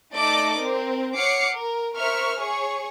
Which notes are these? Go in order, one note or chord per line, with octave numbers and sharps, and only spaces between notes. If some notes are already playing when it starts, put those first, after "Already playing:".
A3 D#4 A4 D5 D#5 D6
C4 A#4
C#5 F#5 D6 F6 C7 C#7
A#4
A#4 C5 E5 C#6 F6
G#4 C#5 C#6